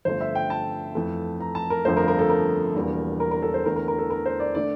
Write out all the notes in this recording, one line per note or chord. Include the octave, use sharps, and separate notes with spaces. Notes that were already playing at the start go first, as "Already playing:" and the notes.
G1 G2 F3 A3 C5
E5
G5
A5
F2 E3 A3
A#5
A5
A#4
G1 F2 D3 F3 A3 C5
A#4
A#4
A4
A#4
E1 E2 D3 G3 A#3
A#4
A#4
A4
C5
E2 D3 A3 A#4
A#4
A#4
A4
A#4
C5
D5
D3 A3 D5